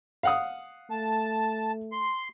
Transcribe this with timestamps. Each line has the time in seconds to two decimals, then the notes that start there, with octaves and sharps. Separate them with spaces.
0.23 F5 F#5 D#6
0.91 A3 A5
1.92 C6